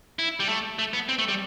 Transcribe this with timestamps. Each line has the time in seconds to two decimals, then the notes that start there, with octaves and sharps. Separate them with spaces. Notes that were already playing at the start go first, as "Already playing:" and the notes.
0.19 E4
0.40 G3
0.49 A3
0.79 A3
0.93 B3
1.09 C4
1.18 A3
1.28 G3